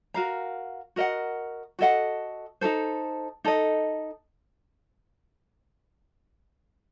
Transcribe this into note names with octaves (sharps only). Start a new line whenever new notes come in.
F#4 A#4 F5 A#5
F#4 A#4 D#5 F#5
F#4 A4 D#5 F#5
D#4 F#4 A4 C5
D#4 A4 D#5